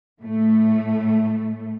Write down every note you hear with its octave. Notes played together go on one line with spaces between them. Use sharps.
A2 A3